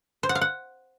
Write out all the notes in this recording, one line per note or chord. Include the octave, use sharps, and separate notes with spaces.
C5
F#5
F5
F#5